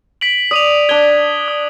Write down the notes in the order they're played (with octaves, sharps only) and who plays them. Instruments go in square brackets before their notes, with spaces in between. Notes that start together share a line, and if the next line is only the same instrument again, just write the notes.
[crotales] B6 D7 F#7
[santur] D5 [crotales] D#6 D#7 F7
[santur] D4 C6 [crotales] G#6 G7
[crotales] D#6